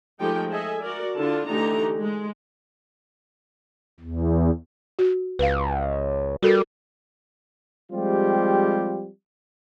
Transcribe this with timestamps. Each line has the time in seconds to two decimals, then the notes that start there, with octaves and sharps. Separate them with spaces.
0.20 F3 G#3 A3 D#4 G4 G5
0.50 G#4 A4 D#5 E5 G#5
0.82 F#4 A#4 D5
1.18 D3 D4 E4 F4 A5
1.49 D3 E3 A3 D#4 G4 A#5
2.02 G#3
4.00 E2
4.99 F#4
5.39 C#2 B4 F5
6.42 G3 F#4 A4 A#4
7.92 F3 G3 G#3 C4 F4 G4